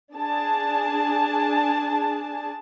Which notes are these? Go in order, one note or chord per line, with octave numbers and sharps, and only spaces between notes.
D4 G#4 A5